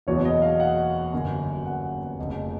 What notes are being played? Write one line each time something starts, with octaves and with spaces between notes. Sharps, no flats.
F#1 E2 B2 F#3 B3 C#5
D#5
F5
F#5
G1 F#2 D3 F#3
F#5
F1 F2 C#3